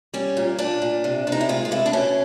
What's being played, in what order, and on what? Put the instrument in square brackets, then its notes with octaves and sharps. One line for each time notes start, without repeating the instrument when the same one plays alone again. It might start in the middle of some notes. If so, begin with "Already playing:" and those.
[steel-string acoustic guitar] G3 C#4
A#2
A#2 D4
A#2
C3
C3
D#4
E4
G#3 F4
F4
C3 E4
D4
B2 C#4